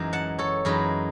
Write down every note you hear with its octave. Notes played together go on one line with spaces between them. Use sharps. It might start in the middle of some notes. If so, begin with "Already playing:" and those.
Already playing: F#2 E3 G#3 D#4
F#5 A5
A4 C#5
F#2 E3 G#3 D#4 G#4 B4